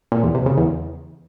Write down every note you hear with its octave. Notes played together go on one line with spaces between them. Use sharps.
A#2
E2
C3
C#3
E2